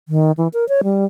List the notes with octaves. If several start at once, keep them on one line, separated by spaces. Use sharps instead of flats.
D#3
E3
A#4
C#5
G3